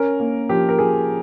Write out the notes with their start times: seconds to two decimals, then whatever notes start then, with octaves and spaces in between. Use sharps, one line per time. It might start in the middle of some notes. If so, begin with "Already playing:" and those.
Already playing: C#4 A#4
0.20 A#3
0.49 F3 G4
0.69 A#4
0.79 F3 G#4